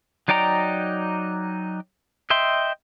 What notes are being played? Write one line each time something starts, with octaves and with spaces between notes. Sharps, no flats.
F#3 D#4 D5 G5 A#5
D#5 E5 G5 C6